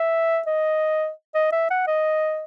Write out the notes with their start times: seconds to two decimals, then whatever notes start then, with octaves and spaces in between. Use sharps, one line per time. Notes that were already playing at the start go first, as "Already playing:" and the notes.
Already playing: E5
0.47 D#5
1.34 D#5
1.52 E5
1.70 F#5
1.87 D#5